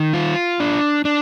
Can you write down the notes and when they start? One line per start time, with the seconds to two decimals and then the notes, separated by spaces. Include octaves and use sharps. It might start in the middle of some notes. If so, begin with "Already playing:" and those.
Already playing: D#3
0.14 F4
0.60 D4
1.05 D4